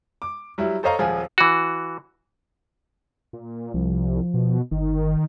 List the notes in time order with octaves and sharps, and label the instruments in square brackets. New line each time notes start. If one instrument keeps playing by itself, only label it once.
[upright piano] D6
F#3 G3 E4
A4 C5 C#5 D#5 F5 A#5
D#1 F3 F4 G#4
[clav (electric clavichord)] E3 F#4
[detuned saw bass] A#2
[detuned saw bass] C2 [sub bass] F3
[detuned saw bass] B2
[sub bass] G1 [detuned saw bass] D#3